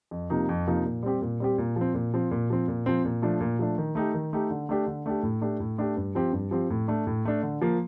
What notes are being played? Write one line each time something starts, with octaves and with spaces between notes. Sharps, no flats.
F2
C3 F3 A#3 D#4
F2
C3 F3 A#3 D#4
A#2
G3 C4 G4
A#2
G3 C4 G4
A#2
F3 C4
A#2
F3 C4
A#2
F3 C4
A#2
F3 C4
A#2
F3 A3 D4
A#2
F3 A3 D4
D#3
A3 D#4 G4
D#3
A3 D#4 G4
D3
A3 D4 G4
D3
A3 D4 G4
A2
A3 D4 G4
A2
A3 D4 G4
G2
F3 C4 G4
G2
F3 C4 G4
A2
A3 D4
A2
A3 D4
D3
F3 A#3